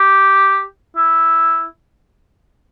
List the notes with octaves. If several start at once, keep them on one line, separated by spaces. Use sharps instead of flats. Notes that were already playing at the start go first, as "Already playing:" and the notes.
Already playing: G4
E4